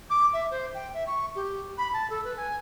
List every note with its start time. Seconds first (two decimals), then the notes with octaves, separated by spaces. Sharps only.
0.10 D6
0.34 E5
0.51 C5
0.74 G5
0.94 E5
1.07 C#6
1.35 G4
1.78 B5
1.93 A5
2.10 A4
2.24 B4
2.37 G#5